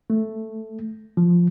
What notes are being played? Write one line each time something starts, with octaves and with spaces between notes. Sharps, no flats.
A3
F3